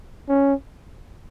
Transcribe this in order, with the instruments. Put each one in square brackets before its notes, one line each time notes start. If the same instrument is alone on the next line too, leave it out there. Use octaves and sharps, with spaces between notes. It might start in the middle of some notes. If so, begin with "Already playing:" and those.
[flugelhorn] C#4